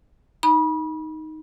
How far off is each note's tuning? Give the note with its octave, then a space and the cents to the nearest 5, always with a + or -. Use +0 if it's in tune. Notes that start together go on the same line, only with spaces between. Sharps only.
D#4 +5 B5 -30